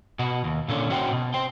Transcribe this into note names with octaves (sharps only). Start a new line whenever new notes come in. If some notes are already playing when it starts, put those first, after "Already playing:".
B2 F#4
D#2
A#2 D3 C#4
C#4 F#4 C5 G5
B2
C5 G5